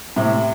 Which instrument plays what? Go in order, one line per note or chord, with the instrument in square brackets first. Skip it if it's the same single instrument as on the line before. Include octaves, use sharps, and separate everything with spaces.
[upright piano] A2 C3